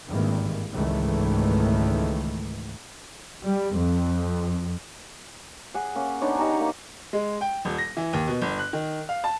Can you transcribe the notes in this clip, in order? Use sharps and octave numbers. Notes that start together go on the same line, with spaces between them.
G#1 G2 D#3 E3 A#3
G#1 C#2 D#3 E3 A3
G3
F2
G#4 F#5
A#3 C#4
B3 D4 D#4 C#5
D#4 G4 A#5 C#6
A#3
G#3
G5
D#1
A#6
E3
D#2
B2
G1
F#6
D#3
F5
A5